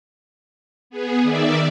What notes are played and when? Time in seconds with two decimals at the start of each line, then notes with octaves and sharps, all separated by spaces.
0.90 B3 G#4
1.22 D#3 D5 E5